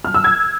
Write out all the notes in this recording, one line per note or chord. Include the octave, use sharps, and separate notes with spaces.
F6
E6
G#6